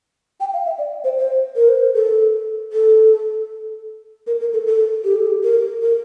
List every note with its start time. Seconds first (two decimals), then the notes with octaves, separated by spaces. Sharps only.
0.40 G5
0.54 F5
0.66 E5
0.78 D5
1.04 C5
1.18 C5
1.56 A#4
1.69 C5
1.80 A#4
1.94 A4
2.73 A4
4.27 A#4
4.40 A#4
4.53 A4
4.67 A4
5.04 G4
5.16 A4
5.27 G4
5.43 A#4
5.82 A#4